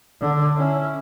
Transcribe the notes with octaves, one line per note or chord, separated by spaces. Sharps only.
D3
C#4 E4